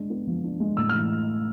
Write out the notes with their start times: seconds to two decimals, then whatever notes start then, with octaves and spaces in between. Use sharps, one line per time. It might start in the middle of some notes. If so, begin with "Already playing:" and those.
Already playing: G#3 D4
0.10 B3
0.27 F3
0.44 D4
0.60 G#3
0.77 A2 E6
0.89 F6
0.94 E3